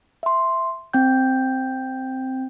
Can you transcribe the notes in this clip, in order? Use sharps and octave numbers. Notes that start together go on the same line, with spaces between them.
E5 C6
C4 G5 G6